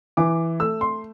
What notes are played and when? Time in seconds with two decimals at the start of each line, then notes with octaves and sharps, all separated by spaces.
0.17 E3 D6
0.60 A3 E6
0.81 C6